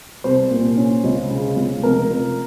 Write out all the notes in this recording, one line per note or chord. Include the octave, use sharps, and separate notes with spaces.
C2 C5
A#2
C#4
C#2
C#3
C#2
F1 A#4
F2